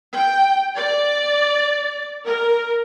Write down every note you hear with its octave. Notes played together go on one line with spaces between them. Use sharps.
G5
D5
A#4